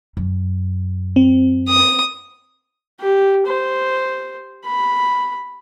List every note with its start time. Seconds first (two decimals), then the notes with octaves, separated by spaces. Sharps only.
0.17 F#2
1.16 C4
1.68 D#6
3.00 G4
3.46 C5
4.65 B5